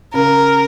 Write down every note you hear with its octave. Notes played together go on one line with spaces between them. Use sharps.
C#3 A#4